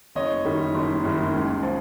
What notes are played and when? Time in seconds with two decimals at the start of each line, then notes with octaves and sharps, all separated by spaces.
0.15 F#1 C#5 D#5
0.44 F#2 D#3 G3
0.74 F#1
1.03 F#2 D#3 G3
1.33 C#2
1.63 F3